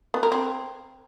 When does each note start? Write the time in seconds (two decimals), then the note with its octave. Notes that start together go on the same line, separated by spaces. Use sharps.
0.14 B3
0.23 A#4
0.32 C4